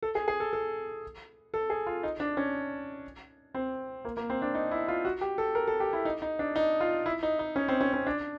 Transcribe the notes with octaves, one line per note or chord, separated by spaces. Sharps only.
A4
G#4
G#4
A4
A4
A4
G#4
F4
D#4
D4
C#4
C4
A#3
A#3
C4
D4
D#4
E4
F4
F#4
G4
A4
A#4
A4
G4
E4
D#4
D#4
D4
D#4
F4
E4
D#4
D#4
C#4
C4
C#4
C#4
D4